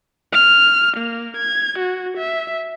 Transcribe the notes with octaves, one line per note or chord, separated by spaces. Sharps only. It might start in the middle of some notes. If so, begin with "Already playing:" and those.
F6
A#3
G#6
F#4
E5